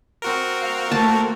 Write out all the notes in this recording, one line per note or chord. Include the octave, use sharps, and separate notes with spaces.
C4 F#4 A#4
F5
A3 A#3 A5